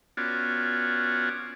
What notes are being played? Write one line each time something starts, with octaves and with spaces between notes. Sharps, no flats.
B3 C#4 F4 F#4 D5